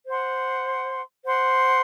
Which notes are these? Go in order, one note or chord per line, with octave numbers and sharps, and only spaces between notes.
C5 F#5 C6
C5 F#5 C6